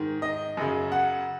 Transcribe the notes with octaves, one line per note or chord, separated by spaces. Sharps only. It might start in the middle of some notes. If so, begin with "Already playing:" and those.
Already playing: G#2 D#3
D#5
F#2 C#3
F#5